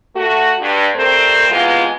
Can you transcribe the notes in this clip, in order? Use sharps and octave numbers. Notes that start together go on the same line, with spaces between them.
A3 F#4
G2
G3 A3 C4 A#4 C5
C3 E3 G#3 B3 F4